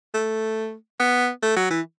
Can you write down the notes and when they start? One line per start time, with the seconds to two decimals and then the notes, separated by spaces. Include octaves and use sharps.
0.14 A3
0.99 B3
1.43 A3
1.57 F#3
1.71 E3